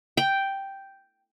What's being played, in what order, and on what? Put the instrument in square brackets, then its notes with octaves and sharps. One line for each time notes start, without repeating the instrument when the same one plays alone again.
[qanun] G5